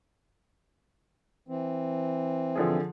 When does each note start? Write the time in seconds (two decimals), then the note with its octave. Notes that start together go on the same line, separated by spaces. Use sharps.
1.48 E3 C4
2.55 D3 F3 G#4